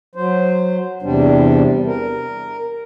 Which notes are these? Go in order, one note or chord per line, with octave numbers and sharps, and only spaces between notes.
F#3 C5
E2 C3 G3 D4
A#4